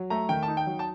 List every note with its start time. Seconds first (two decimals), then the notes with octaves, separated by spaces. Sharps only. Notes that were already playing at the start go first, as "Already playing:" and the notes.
Already playing: F#3
0.10 A3 A#5
0.29 D#3 G5
0.43 A5
0.48 D#4
0.57 G5
0.67 F#3
0.79 A5